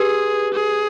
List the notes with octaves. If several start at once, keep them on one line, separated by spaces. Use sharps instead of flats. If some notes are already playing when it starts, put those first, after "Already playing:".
Already playing: G4 G#4 B4
G#4